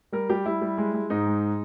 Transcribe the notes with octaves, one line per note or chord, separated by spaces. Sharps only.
G3 A#4
G3 G4
G3 E4
G3
G#3
G#3
G#2 D#4
G#3